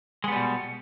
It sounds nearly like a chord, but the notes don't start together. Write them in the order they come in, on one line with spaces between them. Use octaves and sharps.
G#3 B3 G3 B2